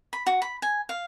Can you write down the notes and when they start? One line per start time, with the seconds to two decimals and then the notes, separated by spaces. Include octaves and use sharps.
0.13 B5
0.26 F#4
0.42 B5
0.62 G#5
0.89 F5